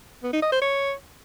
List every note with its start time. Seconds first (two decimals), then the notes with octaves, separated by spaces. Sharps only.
0.23 B3
0.33 D#4
0.42 D#5
0.52 C5
0.61 C#5